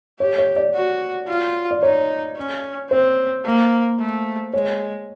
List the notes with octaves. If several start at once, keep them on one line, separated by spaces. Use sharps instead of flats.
G4 C#5
C#5
D5
F#4
F4
D5
D#4 C#5
C#4
C4 C5
A#3
A3
G#3 C#5